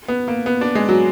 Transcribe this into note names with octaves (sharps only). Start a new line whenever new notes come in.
B3
A#3
B3
D4
G#3
F#3